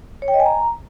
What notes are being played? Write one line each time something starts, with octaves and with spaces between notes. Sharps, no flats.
C#5
G5
D#5
G#5
A#5